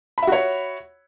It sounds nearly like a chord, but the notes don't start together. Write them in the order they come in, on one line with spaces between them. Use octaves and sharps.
B5 E5 F#4 C#5